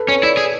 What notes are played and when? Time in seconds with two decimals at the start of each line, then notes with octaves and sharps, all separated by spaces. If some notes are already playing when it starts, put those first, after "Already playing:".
Already playing: A4 B4
0.08 C#4 C#5
0.23 E4 D5
0.37 G#4